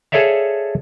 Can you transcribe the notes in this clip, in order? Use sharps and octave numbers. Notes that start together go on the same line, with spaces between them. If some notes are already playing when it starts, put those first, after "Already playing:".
G#4 A4 C#5 D5 E5 F5